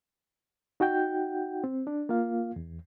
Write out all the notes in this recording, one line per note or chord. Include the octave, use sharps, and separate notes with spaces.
D#4 F#4 F#5 G5 G6
C4
D4
A#3 F4 F5
E2